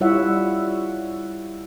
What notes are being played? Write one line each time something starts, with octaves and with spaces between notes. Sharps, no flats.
G3 E4 F4 C#5 E5 F#5